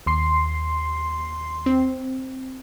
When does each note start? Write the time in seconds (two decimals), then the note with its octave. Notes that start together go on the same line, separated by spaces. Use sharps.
0.06 D#2 C6 C7
1.66 C4